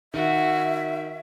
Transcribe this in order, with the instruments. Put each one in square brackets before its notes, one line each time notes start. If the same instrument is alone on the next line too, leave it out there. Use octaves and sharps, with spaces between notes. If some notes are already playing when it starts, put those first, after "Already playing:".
[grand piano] D#3 [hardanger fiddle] F#4 [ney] E5